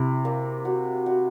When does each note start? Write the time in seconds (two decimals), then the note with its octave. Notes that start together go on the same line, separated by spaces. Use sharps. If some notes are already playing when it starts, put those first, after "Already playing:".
Already playing: C3 E4
0.25 A#3
0.65 F#4
1.06 F#4